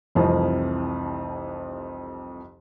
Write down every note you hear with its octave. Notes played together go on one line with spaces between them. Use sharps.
F1 C2 F2 E3 F3